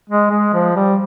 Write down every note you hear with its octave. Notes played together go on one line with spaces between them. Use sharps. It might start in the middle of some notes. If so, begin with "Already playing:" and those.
G#3
G#3
F3
G3